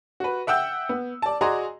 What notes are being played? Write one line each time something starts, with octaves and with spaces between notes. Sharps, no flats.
F#4 B4
E5 F#5 G5 E6 G6
B3
D5 A5
F#4 G#4 D5 D#5 A#5 C6